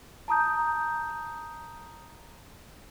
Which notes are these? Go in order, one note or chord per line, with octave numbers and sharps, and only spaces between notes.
A5 A#5 D#6 G6